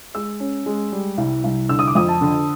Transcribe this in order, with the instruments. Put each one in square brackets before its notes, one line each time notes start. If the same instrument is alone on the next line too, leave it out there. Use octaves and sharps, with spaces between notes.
[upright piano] G#3 E6
C#4
G#3
G3
C2
C2
D3 E6
D#6
D6
F2 D#6
A5
D3